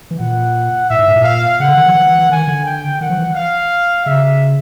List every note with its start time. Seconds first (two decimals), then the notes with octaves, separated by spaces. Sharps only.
0.11 E3
0.19 A#2 F#5
0.89 A2 E5
0.99 G#2
1.08 A2
1.16 A#2
1.24 F5
1.59 C#3 F#5
1.68 D3
1.77 D#3
1.86 F3
1.95 E3
2.06 E3
2.19 E3
2.29 D#3 G#5
2.47 D3
2.65 G5
3.00 D#3 F#5
3.10 F3
3.18 E3
3.35 F5
4.05 C#3 E5